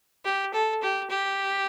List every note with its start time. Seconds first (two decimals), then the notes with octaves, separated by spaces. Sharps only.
0.25 G4
0.53 A4
0.82 G4
1.10 G4